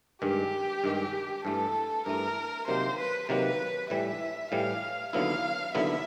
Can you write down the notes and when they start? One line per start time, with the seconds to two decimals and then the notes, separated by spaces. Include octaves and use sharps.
0.22 G2 D#3 G#3 G4
0.84 G2 D#3 G#3
1.45 G2 E3 A3 A4
2.06 G2 E3 A3 A#4
2.68 C3 D#3 F#3 A#3 C5
2.99 B4
3.29 C3 D#3 F#3 A#3 B4
3.90 A2 E3 G3 E5
4.52 A2 E3 G3 F5
5.13 D#2 D3 F#3 B3 E4 F5
5.75 D#2 D3 F#3 B3 E4 E5